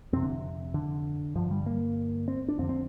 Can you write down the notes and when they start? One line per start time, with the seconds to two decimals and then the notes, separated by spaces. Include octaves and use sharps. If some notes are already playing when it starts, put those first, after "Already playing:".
0.13 F2 C3 C4
0.23 D3
0.74 D3
1.35 G2 D3 F3
1.51 G3
1.66 A#3
2.28 C4
2.48 D4
2.59 F2 C4
2.62 D3
2.69 C4